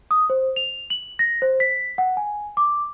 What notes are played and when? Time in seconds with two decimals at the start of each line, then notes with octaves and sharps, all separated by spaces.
0.11 D#6
0.30 C5
0.56 F7
0.90 F#7
1.19 A#6
1.42 C5
1.60 B6
1.98 F#5
2.17 G#5
2.57 D6